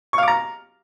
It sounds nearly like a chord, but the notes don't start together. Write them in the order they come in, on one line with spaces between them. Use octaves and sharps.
C#6 F5 D6 A#5